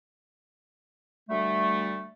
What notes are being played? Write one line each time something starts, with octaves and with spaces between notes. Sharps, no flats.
D2 G3 A3